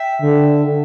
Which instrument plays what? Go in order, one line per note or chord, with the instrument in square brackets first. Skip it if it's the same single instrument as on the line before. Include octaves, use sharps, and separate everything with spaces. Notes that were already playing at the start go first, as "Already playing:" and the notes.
Already playing: [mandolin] E5 G5
[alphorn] D3